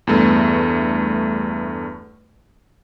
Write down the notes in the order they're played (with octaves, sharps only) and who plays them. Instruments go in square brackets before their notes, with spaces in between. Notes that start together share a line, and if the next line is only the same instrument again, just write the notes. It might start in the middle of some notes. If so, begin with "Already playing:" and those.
[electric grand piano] E2 G2 A3